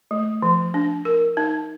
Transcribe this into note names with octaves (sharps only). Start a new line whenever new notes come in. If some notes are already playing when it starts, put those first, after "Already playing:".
A3
F3
D4
A#4
D#4